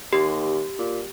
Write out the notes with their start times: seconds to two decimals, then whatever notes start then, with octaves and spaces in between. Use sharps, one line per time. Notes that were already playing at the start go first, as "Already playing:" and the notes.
0.13 D#2 G4
0.79 A#2